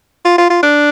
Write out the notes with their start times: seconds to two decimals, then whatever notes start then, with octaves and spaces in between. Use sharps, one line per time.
0.25 F4
0.38 F4
0.50 F4
0.63 D4